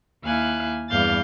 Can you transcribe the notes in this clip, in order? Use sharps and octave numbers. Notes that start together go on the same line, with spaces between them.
D#2 E4 F5 G#5 F#6
E2 G2 F5 F6 G6 A6